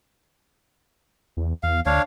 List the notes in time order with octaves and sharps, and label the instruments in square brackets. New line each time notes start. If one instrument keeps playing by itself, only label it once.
[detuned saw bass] E2
[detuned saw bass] E2 [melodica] F5
[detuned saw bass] D2 [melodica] D4 C#5 F5